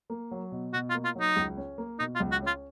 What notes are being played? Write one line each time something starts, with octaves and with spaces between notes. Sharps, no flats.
A#3
F#3
B2
B2 F#4
F4
A#3
F4
F#3 D#4
C#2
C#4
A#3
B2 D#4
F4
C#2
F#4
C#4 F4